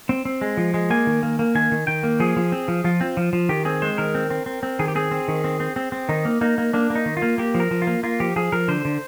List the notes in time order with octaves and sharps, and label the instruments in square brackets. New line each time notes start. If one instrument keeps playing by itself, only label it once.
[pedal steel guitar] C4
C4
G#3
F3
G#3
A#3 G#5
D#3
A#3
A#3
D#3 G#5
D#3
D#3 G5
A#3
F3 G#4
F3
C4
F3
F3 F4
C4
F3
F3
D#3 G4
C4 G#4
G#3 C5
D#3 A#4
C4
C4
C4
C4
D#3 G#4
G4
C4 G#4
C4
D#3
C4
C4
C4
C4
D#3 D#4
A#3
A#3 D#4
A#3
A#3 D4
A#3
D#4
D#3
F4
A#3
A#3 G4
F3
A#4
F3
F4
A#3
A#3 F4
F3 G4
F3 G#4
F3 A#4
D3 C5
D3